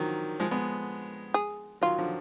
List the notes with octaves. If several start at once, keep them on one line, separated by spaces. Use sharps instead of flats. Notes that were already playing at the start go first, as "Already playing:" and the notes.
Already playing: D3 D#3 F3 F#3
F3 G#3
G#3 B3
G#4
D#3 F#3 F4
D3 F3